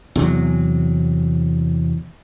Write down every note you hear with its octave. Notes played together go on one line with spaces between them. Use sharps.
E2 C3 F#3